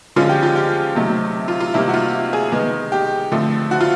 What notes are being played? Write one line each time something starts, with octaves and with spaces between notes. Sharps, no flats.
D3 F3 G#3 C#4 F4
G4
F4
G4
C3 D#3 F#3 A3
F4
F4
C3 D#3 G3 A#3 E4
F#4
F4
G#4
D#3 G#3 B3
G4
D3 F3 A3 C4
F#4
F4